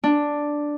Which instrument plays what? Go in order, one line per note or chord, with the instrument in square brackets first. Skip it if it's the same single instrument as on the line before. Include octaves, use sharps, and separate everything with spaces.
[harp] D4